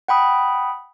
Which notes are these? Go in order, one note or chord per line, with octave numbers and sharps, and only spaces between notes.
F#5 G5 B5 D#6